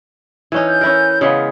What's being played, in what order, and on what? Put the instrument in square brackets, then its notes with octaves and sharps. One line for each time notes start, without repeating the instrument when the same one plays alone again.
[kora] E3 C#4 D#4
[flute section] G#5 G6
[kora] C#4 E4 A#4
[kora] C#3 G#3 B3 [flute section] F5